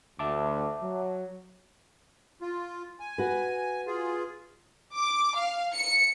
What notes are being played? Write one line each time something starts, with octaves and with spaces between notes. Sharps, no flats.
D2 E5 A5 D6
F#3
F4
G#5
F#4 B4
F4 G#4
D6
F5
C#7